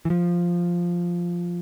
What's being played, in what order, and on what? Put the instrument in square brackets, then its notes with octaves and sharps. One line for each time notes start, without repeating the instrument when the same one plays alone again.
[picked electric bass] E3
F3